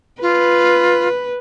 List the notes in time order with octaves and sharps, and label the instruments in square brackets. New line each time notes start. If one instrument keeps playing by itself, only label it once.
[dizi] F4 [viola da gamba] B4